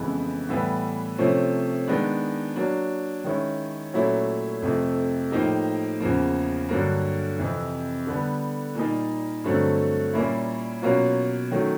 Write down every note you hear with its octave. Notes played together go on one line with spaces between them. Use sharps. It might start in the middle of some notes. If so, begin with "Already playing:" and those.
Already playing: F2 C#3 E3 G#3 B3
A2 E3 G3 B3
C3 F3 A3 C#4
D#3 G#3 B3 D4
F#3 A#3 D4
D#3 G#3 C#4 E4
A#2 F#3 A3 C#4 E4
F2 C3 F3 A3
A2 F3 A#3 D#4 G4
E2 C#3 F3 A#3
G2 D3 F#3 A#3
F2 C3 E3
D3 G3 B3
A#2 G3 A#3 D#4
G2 D3 F#3 A3 C4
A#2 G3 A#3 C#4 E4
B2 F#3 A#3 C#4 F4
D#3 F#3 A3 C#4